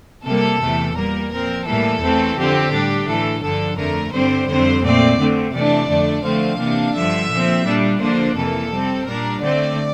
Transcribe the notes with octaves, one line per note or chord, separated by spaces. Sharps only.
C3 G3 A#3 A4
E2 C3 E3 A3
A#2 G3 A#3 A#4
A#2 F3 C4 A#4
A2 E3 G3 A#3 A4
E2 E3 A3 C4
F2 D3 F3 C4 G4
A2 G3 D4
A2 E3 A3 A4
G2 D3 F3 A4
F2 D3 A3 A#4
G2 D3 G3 C4 C5
F2 D3 G3 C4 C5
A#2 A3 C4 D5
D3 A3 C4
C3 E3 A3 D4 D5
F2 D3 A3 D4
D3 F3 A3 C4 F5
C3 E3 A#3 D4
G2 D3 F3 E5
A#2 F3 C4
A#2 G3 D4
D3 F3 A#3 D4 C5
F2 C3 E3 A#3 A4
C3 G3 C4
A#2 G3 D4 A#4
D3 A3 C4 D5